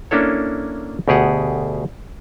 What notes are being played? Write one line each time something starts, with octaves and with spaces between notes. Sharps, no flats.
A#3 C#4 D4 E4 A4 C#5
D2 B2 G4 G#4 F#5